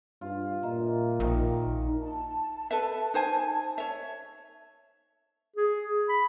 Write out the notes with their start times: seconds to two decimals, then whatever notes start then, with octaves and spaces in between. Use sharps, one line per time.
0.21 G2 F4
0.63 A#2 D#5 E5 A#5
1.20 A#1 D#3 D#4
2.01 A5
2.71 A4 B4 E5
3.14 D#4 C5 G#5
3.78 C#5 E5
5.56 G#4
6.09 B5